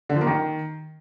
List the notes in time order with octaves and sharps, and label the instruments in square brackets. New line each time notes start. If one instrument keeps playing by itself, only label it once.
[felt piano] D3
F3
A#3
D#3